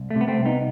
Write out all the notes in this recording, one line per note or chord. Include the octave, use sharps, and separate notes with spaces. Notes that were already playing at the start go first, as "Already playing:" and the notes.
Already playing: C2
A3
C3
B3
A3 C4
C2
B3 D#4